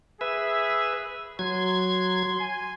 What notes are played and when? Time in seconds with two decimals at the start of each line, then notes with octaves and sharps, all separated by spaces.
0.21 G#4 B4 E5
1.39 F#3 C6 G#6
2.40 G#5